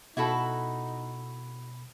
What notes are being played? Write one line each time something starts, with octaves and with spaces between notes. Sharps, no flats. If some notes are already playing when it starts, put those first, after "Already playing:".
B2 D#4 E4 F#4 A4 B5